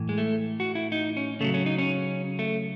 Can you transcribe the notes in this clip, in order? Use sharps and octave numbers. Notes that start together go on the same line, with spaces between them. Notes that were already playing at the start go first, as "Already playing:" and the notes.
Already playing: A2 E3
G#3
A3
F#4
E4
D#4
C#4
C#3 F#3 A3
C#4
D#4
C#4
A3